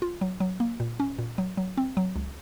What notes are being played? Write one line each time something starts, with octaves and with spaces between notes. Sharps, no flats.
F4
F#3
F#3
A#3
A#2
C#4
A#2
F#3
F#3
C4
F#3
C#2